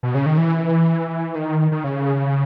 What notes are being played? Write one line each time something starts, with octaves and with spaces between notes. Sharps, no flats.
B2
C#3
D#3
E3
D#3
D#3
C#3